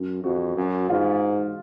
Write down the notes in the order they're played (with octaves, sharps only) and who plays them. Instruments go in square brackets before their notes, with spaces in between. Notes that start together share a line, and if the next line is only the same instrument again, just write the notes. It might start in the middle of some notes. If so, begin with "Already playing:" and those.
Already playing: [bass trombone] F#2
[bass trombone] F2 [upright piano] F#4
[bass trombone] F#2
[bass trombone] G#2 [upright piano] F4